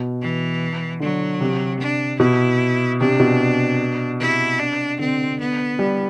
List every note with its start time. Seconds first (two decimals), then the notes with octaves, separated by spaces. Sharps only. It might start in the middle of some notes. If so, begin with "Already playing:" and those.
Already playing: B2
0.21 E3
1.00 D3 F#3
1.41 C3
1.80 D4
2.20 B2 E4
3.00 C3 D4
3.20 B2
4.20 C3 E4
4.59 D4
4.99 D3 C4
5.40 B3
5.79 G3